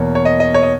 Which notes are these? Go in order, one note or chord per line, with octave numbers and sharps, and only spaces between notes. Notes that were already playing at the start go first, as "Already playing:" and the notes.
Already playing: E2 B2 A#3 C#5
C#5
D#5
D#5
C#5
D#5